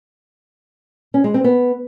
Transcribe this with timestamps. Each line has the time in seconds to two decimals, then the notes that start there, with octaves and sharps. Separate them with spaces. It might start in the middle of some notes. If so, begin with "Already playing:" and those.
1.14 C#4
1.24 G#3
1.34 C4
1.44 B3